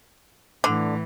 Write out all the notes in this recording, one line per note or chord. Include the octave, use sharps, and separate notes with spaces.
A2 D3 E3